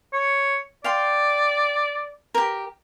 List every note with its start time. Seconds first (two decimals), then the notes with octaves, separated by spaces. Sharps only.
0.13 C#5
0.84 D5 F5 G5 C6
2.34 G4 A#4